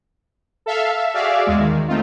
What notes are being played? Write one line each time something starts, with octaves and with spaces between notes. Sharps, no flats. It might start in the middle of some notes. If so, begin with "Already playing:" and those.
A4 E5 F5
E5
F#4 G#4 D5 E5 F5
E2 G#3
D#3
A3 C4 D#4 F4